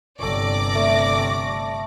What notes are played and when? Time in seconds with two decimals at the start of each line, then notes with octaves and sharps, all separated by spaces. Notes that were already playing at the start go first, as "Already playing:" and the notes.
0.20 G1 C3 A4 C#5 D5 D6 A#6
0.75 A3